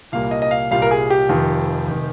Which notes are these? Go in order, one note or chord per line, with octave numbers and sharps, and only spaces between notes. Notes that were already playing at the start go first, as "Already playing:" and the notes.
C2 A#2 G3 A#3 F5
D#5
D#5
F5
C2 A#2 G3 A#3 F5
A#4
G#4
G4
F1 F2 D#3
F1 D#3